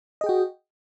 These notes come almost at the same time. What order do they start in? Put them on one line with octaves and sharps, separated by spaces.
D#5 G#4 G5 F#4